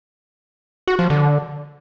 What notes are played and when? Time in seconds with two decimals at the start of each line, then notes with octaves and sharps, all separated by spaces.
0.88 F#4
0.99 F3
1.10 D3